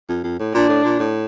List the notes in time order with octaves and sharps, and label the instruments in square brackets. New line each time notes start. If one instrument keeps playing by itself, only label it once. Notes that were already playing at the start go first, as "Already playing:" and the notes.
[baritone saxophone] F2
F2
A2
[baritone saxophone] A#2 [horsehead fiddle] D4
[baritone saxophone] A2
A#2
A2